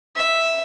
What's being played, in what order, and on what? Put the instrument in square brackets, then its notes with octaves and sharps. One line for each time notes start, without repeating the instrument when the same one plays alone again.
[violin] E5